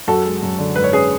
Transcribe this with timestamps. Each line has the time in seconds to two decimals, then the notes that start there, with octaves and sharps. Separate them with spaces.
0.08 F#2 F#4 A4
0.26 G#3
0.43 F#2
0.59 D3
0.76 G#2 B4
0.84 C#5
0.93 C#4 G#4 B4